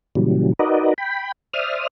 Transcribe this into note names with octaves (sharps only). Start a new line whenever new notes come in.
A#2 C#3 E3 F#3 G3
D#4 F#4 A#4 B4 D5 D#5
G5 B5
C5 D5 E5 D#6 F6